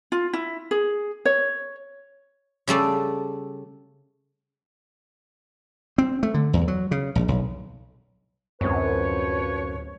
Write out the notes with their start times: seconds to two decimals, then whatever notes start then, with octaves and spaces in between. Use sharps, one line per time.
0.12 F4
0.33 E4
0.71 G#4
1.26 C#5
2.67 C#3 G3 A3 D5
5.98 C4
6.23 A3
6.34 D3
6.53 E2
6.68 F#3
6.91 C#3
7.15 A#1
7.28 B1
8.61 D1 F#2 F3 C4 B4 C#5